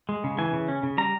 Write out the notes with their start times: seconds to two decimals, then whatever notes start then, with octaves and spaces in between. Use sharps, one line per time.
0.09 G#3
0.24 C#3
0.38 E3 G#5
0.53 C#3
0.68 C#4
0.83 C#3
0.98 G3 A#5